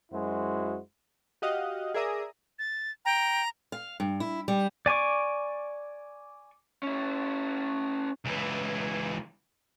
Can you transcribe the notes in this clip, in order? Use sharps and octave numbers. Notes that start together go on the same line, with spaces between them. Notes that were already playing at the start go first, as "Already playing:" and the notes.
F#2 G#3 E4 F#4 C5
F#4 G4 D#5 F5 F#5
G#4 A#4 D5 E5 A#5 D#6
A6
G5 A#5
F5
G2
E4
G3
D5 G#5 C#6 D6
C#4 E4
C#2 E3